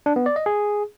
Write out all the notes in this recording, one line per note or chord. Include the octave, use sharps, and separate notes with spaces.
D4
B3
D5
D#5
G#4